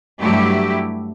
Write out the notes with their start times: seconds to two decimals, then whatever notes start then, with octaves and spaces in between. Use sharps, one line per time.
0.20 G2 F#3 A3 E4 G4